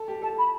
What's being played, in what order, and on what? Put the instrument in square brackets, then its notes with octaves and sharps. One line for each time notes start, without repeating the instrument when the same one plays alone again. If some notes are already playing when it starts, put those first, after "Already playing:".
Already playing: [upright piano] A4
G4
[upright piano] A4 [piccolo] A5
[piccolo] B5